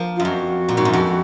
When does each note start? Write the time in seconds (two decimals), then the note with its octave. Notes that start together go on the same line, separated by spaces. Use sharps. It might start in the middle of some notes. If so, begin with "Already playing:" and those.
Already playing: F3 A#3
0.16 F#2 F4
0.25 F2 F#4
0.69 A#2
0.77 G#2
0.85 F#2
0.93 F2